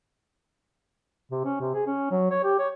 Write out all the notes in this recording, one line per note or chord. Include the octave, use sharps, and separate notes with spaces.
C3
C#4
C3
G#4
C#4
F#3
C#5
G4
C#5